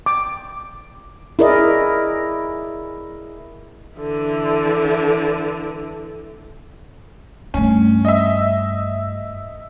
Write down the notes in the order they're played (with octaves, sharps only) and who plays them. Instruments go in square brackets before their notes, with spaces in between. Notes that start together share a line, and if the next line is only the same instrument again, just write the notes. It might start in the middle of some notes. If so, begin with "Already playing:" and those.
[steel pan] D6
[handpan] E4 G#4 A#4 D5 D#5
[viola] D3 E3
[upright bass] G2 A3 [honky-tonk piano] C#4
[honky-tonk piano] D#5 E5